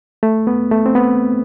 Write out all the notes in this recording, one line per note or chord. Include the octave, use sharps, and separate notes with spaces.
A3
B3
A3
C4
B3